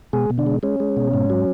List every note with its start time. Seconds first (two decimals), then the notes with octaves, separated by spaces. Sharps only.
0.13 B2 G#3 G#4
0.30 B2
0.38 D3 D4
0.47 G#3
0.63 G#3 C#4
0.80 G#3
0.97 B2
1.13 G#2
1.30 F#3